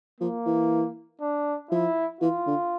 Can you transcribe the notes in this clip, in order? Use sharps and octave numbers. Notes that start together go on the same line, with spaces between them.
F3 A#3
E3
D4
F3 E4
E3 F4
D3